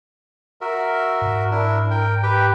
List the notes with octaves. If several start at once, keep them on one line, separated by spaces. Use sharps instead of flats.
F#4 A#4 E5
G#2
D4 E4 A#4
A#4 G5
G4 B4 G5